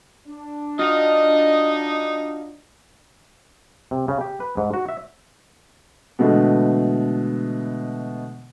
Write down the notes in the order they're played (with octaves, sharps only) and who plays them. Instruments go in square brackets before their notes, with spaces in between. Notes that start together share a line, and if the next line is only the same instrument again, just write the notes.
[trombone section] D4
[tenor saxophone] D#4 [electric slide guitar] F4 F#4 F5 [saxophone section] D#5
[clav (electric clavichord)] C3
C#3
G4
B4
G#2
F#4
E5
[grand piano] B2 D3 E3 G#3 A3 B3